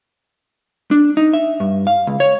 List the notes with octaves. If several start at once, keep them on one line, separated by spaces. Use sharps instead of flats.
D4
D#4
E5
G2
F5
C#2
C#5